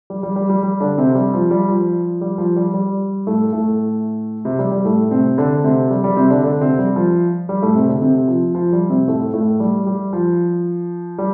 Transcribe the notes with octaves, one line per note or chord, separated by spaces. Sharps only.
G3
G3
G3
G3
G3
D3 D4
C3 C4
G3
F3
G3
F3
G3
F3
G3
G3
A2 A3
A2 A3
C3 C4
G3
G3
A2 A3
C3 C4
D3 D4
C3 C4
G3
G3
C3 C4
D3 D4
D3 D4
C3 C4
G3
F3
G3
A2 A3
C3 C4
D3 D4
C3 C4
F3
F3
G3
C3 C4
A2 A3
A2 A3
G3
G3
F3
G3